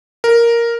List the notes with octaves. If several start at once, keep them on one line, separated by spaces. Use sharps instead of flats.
A#4